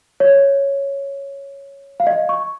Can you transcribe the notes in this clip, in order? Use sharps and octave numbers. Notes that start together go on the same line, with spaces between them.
C#5
F5
D#5
C#6